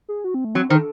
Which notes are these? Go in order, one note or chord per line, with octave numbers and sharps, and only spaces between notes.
G#4
F#4
C4
A3
F#3 C4
D#3 C5
A4